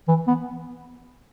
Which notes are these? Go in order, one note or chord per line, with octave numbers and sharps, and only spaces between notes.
E3
B3